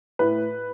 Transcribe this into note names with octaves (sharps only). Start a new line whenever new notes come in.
A2 B4